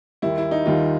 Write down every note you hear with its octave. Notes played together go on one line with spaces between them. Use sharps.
D#2 D#3 G3 E4
E4
D#4
D#2 D#3 G3 F4